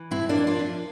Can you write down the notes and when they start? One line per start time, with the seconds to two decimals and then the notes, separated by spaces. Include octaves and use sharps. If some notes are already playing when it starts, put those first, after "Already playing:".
Already playing: E3
0.11 G2 C4 E4
0.29 A#3 D4
0.35 F3
0.47 D4 F4
0.59 F3